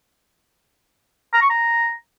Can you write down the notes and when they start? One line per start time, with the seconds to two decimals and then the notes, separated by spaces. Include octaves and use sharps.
1.33 A#5
1.42 C#6
1.50 A#5